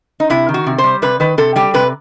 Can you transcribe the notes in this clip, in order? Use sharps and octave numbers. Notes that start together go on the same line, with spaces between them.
D#4
C3 E4
D#3
F#4
C3
C5
G3
C3 B4
D#3 B4
C3 A4
G3 G4
C3 B4